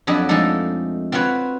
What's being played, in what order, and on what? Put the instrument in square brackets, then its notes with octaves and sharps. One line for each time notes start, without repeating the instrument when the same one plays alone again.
[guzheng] F2 F#3 D4 D#5 B5
F3 G#3 A3 D4 D#4 A4
C4 F4 F#4 B4 C#5